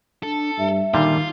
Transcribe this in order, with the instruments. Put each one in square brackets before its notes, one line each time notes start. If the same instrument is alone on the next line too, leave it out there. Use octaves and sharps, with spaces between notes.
[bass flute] D4 [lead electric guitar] A4
[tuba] G2 [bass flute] E5
[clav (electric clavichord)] A#2 D3 G3 [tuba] D#3 [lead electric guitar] F4